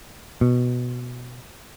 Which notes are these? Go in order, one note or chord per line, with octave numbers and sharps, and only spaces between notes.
B2